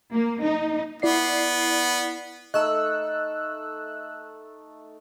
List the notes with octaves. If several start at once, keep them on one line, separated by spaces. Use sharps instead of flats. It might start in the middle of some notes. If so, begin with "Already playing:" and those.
A#3
D#4
B3 E4 D5 C7
A3 D#4 A4 D#5 E6 F#6